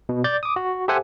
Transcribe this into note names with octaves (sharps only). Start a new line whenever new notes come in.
B2
D5 G6 A6
D6 D#6
F#4
G4 A4 C5 E5 F#5 G#5